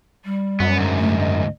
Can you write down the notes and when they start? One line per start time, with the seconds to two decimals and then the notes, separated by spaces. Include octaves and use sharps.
0.25 G3
0.60 F#2 B3
0.78 D2 G#2
0.99 A3
1.18 D#5